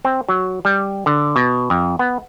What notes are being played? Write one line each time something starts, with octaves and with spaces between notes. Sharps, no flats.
C4
F#3
G3
D3
B2
F2
B3